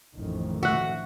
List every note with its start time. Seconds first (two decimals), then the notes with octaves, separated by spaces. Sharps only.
0.14 A1 F2 D#3
0.63 F#4 E5 F#5